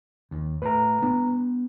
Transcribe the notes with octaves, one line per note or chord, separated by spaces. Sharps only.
D#2
A2 B4 A#5
B3 D4